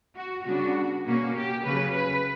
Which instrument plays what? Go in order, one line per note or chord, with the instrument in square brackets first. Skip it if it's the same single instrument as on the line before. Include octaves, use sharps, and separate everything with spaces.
[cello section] F#4
C#3 G3 B3 D4 F#4
B2 A#3 C#4 F#4
G4
C#3 F#3 C#4 B4
B4